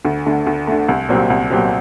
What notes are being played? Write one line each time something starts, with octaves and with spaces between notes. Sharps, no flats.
D2
D3 A3
D2
D3 A3
C2
A#2 F#3 C4 G4
C2
A#2 F#3 C4 G4